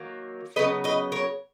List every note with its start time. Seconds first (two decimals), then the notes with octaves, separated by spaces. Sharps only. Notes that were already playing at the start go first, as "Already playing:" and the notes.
Already playing: D#3 F#3 A#3
0.56 C#3 F#3 B3 B4 D#5
0.84 B4 D#5
1.12 A#4 C#5